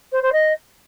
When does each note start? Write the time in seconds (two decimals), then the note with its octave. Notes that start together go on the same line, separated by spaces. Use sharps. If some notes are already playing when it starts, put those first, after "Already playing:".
0.12 C5
0.22 C5
0.32 D#5